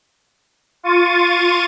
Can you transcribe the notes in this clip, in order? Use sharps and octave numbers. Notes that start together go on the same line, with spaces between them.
F4 C#6 A6 D#7